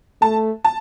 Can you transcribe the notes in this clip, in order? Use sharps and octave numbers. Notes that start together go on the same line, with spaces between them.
A3 A5
A5